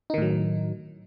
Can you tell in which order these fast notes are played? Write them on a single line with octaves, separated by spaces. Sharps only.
D#4 D#3 A2 F#3